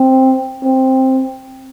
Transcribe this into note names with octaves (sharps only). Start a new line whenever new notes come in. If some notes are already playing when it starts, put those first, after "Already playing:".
Already playing: C4
C4